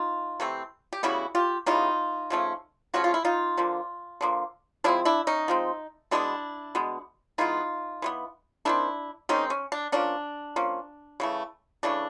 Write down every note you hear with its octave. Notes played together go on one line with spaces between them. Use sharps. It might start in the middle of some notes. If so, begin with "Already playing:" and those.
Already playing: D#4 F4
C3 E3 A3 C4
G4
C#3 E3 G3 B3 E4 F#4
F4 G4
C#3 E3 G3 B3 D#4 F4
C#3 F3 A3 C#4
C#3 F3 A3 C#4 F#4
F4
E4
D#4 F4
D3 F3 A#3
D3 F3 A#3
F3 G#3 C4 D4 E4
D4 E4
C#4 D#4
F3 G#3 C4
B2 G#3 B3 D4 E4
B2 G#3 B3
E3 G#3 B3 D#4 F4
E3 G#3 B3
D#3 G#3 C4 D4 E4
D#3 G#3 C4 C#4 D#4
C#4
D4
F3 A#3 C#4 D4
F3 A#3 C#4
C#3 E3 A3
C#3 E3 A3 D4